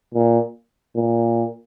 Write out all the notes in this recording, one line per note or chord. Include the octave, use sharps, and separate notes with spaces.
A#2
A#2